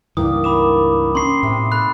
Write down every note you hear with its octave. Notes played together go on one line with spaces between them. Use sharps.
C#2 G2 D#3 E3 A#3 D4 D#6
D#3 D4 B5 D6 E7
C#4 D#4 C6 C#6 C7
A2 C3
A4 B5 F#6